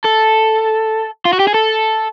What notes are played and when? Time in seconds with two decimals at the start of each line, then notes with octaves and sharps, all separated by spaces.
0.04 A4
1.25 F4
1.33 F#4
1.39 G4
1.47 G#4
1.54 A4